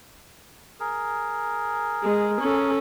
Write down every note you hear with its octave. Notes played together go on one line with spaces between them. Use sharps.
G#4 A#4
G#3
C#4 A4